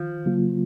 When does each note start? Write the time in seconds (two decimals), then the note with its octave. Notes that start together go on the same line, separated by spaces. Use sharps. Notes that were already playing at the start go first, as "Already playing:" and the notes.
Already playing: D#3 F3
0.25 C#3 F#3 A#3 F4